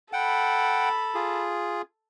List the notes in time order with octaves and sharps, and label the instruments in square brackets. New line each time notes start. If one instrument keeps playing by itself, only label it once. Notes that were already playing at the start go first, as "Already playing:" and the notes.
[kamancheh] A4 B5 [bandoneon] F#5 G5
[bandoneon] F4 G#4